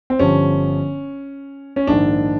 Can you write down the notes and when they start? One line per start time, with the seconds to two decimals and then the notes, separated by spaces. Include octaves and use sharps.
0.10 C4
0.19 G1 G2 D3 F3 C#4
1.76 C#4
1.87 A#1 G#2 D#3 D4